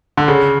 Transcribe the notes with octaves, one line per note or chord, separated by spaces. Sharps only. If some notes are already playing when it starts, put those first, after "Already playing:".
D3
C#3